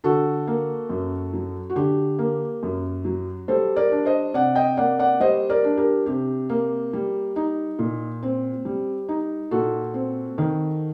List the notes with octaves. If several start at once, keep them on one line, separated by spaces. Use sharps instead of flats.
D3 F#4 A4
A#3
F#2
F#3
F#4
D3 G4
A#3
F#2
F#3
G3 A4 C5
A#4 D5
D4
C5 D#5
C3 D5 F#5
D#5 G5
A#3 D5 F#5
D5 F#5
G3 C5 D#5
A#4 D5
D4
G4 A#4
C3 G4
A#3
G3
D#4
A#2
C4
G3
D#4
A#2 F#4 A4
C4
D#3